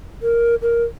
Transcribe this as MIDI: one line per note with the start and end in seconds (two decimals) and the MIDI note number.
0.22 0.55 70
0.62 0.84 70